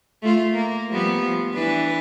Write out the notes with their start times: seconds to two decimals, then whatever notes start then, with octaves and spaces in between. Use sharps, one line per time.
0.22 A3 F4
0.53 A#3
0.89 F3 G3 B3
1.22 F3
1.54 E3 D4 B4